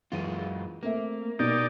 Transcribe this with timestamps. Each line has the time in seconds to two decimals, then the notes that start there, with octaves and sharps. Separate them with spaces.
0.12 F#2 E3 G#3 F4 D#7
0.83 A3 A#3 C4 E5
1.39 B2 D#4 G4 D5